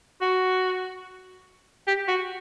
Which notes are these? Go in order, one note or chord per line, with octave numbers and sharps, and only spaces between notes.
F#4
G4
F#4